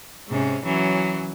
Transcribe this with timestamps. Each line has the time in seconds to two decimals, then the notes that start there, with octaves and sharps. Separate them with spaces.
0.29 G#2 C3 C#4
0.64 E3 F#3 C#4